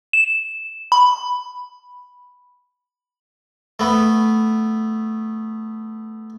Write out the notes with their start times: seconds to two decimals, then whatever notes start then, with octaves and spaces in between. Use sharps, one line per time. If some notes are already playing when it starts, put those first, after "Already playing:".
0.13 E7
0.92 B5
3.79 A3 B3